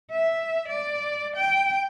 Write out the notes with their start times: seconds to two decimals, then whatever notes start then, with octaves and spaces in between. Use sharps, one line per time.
0.11 E5
0.68 D5
1.36 G5